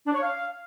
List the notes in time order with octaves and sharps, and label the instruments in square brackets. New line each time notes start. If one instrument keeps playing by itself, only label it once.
[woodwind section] D4
C#5
F5